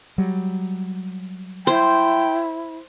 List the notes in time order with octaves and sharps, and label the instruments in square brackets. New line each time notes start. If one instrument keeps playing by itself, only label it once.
[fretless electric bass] F#3 G3
[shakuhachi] E4 [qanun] C5 [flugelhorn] G5